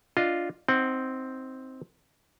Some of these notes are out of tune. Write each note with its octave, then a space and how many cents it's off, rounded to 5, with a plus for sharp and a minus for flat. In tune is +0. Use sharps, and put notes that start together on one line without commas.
D4 +0 F4 +0 D#5 +0
C4 +0 D#4 +20 F#5 +25